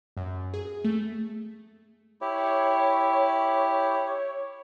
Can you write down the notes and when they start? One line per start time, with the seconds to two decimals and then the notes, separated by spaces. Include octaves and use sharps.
0.17 F#2
0.54 G#4
0.84 A3
2.21 E4 G4 C#5